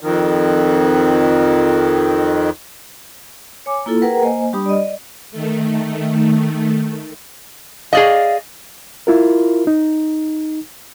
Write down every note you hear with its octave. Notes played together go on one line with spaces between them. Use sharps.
F2 D#3
C#5 G#5 D6
A#3 E4 F4 A4
G#4 A#4 B4 F#5 G5 A#5
A#3 C5 D#5 G#5
G3 D4 G4 B5 D#6
D5 D#5
D#3 A3
G#4 D5 D#5 F5
E4 F4 A#4
D#4